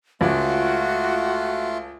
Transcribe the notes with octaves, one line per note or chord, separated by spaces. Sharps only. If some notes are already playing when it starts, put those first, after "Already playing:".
C#2 A3 F4 F#4